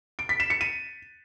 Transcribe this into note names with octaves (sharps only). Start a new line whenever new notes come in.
D7
B6
E7
C#7
D#7